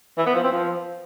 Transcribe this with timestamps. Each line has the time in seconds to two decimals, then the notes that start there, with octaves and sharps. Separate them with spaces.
0.18 E3
0.26 B3
0.35 F3
0.44 C4
0.52 F3